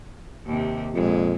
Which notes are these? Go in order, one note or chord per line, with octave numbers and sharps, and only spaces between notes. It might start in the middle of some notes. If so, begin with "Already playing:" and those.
D#2 C3
F2 A#2 G#3